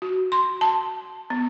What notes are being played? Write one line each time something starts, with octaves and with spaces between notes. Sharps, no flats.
F#4
C6
A5
B3